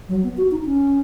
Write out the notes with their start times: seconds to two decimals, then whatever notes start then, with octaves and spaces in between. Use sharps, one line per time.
0.09 F#3
0.23 B3
0.37 F#4
0.51 D#4
0.66 C#4